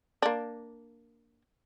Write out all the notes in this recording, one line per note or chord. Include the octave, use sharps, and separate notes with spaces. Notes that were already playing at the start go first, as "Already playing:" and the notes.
A#3 D4